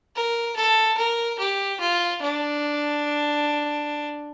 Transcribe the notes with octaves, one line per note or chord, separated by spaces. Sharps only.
A#4
A4
A#4
G4
F4
D4